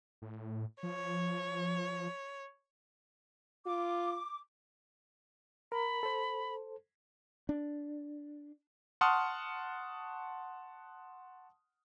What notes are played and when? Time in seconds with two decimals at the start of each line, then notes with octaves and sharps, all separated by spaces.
0.22 A2
0.83 F3 C#5
3.66 F4 D6
5.72 A#4 A#5 B5
6.03 A4 C5
7.49 D4
9.01 F#5 A5 C6 C#6 D#6 F6